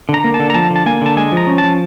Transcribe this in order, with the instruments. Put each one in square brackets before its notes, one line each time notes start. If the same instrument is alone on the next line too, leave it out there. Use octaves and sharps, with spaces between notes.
[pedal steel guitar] D3
A#5
A#3
A5
D3
A#5
F3 A5
D3
A5
A#3 G#5
D3 A5
G#3 G#5
F3 A#5
C#4
A5
F3